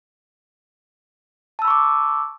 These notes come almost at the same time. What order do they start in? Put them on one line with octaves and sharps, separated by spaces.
A5 E6 B5 C#6 D6